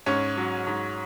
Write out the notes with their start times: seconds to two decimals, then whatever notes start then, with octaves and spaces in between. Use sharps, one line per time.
0.06 G#2 C#4
0.37 F#3
0.67 G#2